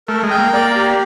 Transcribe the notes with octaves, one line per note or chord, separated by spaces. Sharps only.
A3 A#4
G#3
G5
A#3
A#3 D5
G4